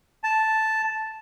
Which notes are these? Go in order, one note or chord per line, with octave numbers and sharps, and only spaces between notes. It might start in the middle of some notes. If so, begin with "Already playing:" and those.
A5